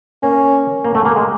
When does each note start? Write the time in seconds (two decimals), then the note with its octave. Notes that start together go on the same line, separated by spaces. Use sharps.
0.22 A#3 C#4
0.85 A#3
0.95 A3
1.05 A#3
1.16 G#3